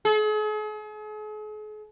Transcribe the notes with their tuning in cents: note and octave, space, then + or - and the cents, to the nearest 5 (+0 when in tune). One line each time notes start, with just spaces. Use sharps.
G#4 +45